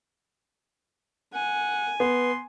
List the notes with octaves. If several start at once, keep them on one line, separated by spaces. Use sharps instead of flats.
F#5 G#5
B3 C6